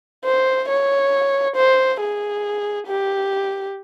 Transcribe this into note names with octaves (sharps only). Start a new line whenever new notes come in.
C5
C#5
C5
G#4
G4